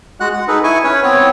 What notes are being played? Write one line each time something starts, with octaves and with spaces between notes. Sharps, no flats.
G#3 F#4 F#5 F#6
F#5
D#4 G#4 A4 B4
E4 G#5 C#6
C#4 B4 C#5
B3 C4 C#5